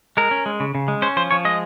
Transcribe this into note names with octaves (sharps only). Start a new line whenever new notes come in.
G#3 A#4
C#4
G#3
C#3
C#3
G#3
C#4 C5
F3 C5
F3 C#5
G#3 D#5